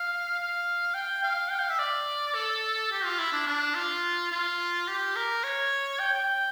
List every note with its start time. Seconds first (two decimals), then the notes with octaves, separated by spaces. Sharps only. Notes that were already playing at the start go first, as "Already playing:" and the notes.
Already playing: F5
0.39 F5
0.94 G5
1.23 F5
1.50 G5
1.60 F5
1.69 E5
1.79 D5
2.34 A4
2.92 G4
3.05 F4
3.19 E4
3.33 D4
3.47 D4
3.75 F4
4.32 F4
4.88 G4
5.16 A#4
5.44 C#5
6.00 G5
6.14 G5